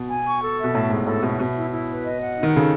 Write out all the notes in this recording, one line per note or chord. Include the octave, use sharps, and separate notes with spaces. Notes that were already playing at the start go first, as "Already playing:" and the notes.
Already playing: B2
G#5
C#6
A4
E5
B2
A2 A5
G#2 A4
A2 A4
B2 E5
B2 E5
E4
E4
B4
D#5
F#5
D#4
D#3
C#3 A4